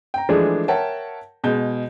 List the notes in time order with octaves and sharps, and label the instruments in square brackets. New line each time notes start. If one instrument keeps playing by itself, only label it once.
[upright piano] G5 A#5
E3 F3 G#3 A3 D4 G#4
A#4 C#5 E5 F#5 G5 A5
B2 G#3 G6